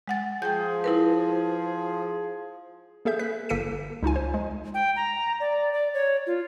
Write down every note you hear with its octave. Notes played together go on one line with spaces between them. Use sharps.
G#3 F#5 A6
F3 G#4 G5 G#5 G6
E4 A#4 B4
A#3 G#4 A4 E5 G6
B4 F#6 B6
G1 A#3 A4 B6 C#7 D#7
C#2 D#4 F4 G#5
C5
G#3
G5
A#5
D5
D5
C#5
F4